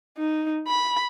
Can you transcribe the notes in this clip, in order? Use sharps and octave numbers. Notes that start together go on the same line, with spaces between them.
D#4
B5